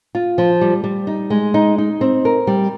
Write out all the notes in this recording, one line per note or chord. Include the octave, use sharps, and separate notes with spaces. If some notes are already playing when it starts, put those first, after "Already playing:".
F4
F3
G3
G3
D#4
G#3
D#4
D#4
C4
A#4
G3